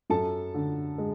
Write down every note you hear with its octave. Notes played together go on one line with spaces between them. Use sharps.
F#2 A4 A5
D3
G#3